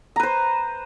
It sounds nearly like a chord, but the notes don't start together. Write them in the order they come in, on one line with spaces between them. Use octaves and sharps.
A#5 B4 C5